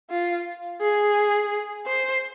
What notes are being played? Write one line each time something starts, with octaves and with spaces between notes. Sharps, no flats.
F4
G#4
C5